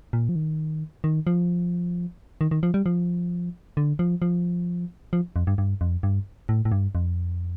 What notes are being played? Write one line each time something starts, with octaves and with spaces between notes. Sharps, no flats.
A#2
F3
D#3
D#3
F3
D#3
D#3
F3
G3
F3
D3
F3
F3
F3
F2
G2
G2
F2
G2
A2
A2
G2
F2